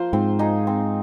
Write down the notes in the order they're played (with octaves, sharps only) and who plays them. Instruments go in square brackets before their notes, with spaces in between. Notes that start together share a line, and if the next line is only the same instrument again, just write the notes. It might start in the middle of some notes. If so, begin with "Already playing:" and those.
Already playing: [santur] F3 A#3 F4 C5
[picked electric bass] G#2 [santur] C4
[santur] D#4 G#4
C4